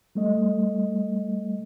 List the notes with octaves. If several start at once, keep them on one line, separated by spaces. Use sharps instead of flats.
G3 A3 D#5